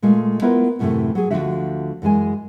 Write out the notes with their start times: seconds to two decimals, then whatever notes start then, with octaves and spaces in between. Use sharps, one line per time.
0.02 A#2 G#3 A3 F4
0.42 B3 E4 F4 A#4 B4
0.79 F#2 A2 C3 D#3 E3 A3
1.15 F#3 G#4
1.31 D2 B2 D3 F3 F#4 E5
2.02 F#2 E3 G#3 G#5